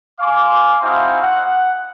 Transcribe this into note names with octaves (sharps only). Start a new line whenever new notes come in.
F5 G#5 C6 D6
C4 D#4 E4 F#4 F5 G#5
F#5